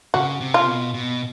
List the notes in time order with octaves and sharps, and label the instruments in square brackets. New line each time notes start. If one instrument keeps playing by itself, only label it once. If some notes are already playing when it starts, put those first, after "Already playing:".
[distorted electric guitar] C#3 [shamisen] F#4
[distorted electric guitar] C3
[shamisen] F4
[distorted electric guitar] B2
B2